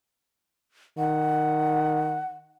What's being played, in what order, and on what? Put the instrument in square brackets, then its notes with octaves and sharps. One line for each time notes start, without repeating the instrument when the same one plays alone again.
[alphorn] D#3 [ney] F#5